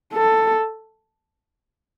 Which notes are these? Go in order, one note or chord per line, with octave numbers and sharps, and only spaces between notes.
A4